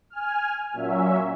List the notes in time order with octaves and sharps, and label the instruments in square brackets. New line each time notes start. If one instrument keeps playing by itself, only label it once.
[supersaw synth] G#5 F6
A#2 F#3 C#4 E5